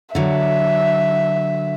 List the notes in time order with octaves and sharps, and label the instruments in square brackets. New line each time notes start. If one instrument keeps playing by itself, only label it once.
[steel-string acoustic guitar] D3 F#3 [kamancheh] E5